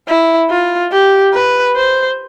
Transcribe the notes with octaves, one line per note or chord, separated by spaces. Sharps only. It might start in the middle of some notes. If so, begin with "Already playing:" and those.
E4
F4
G4
B4
C5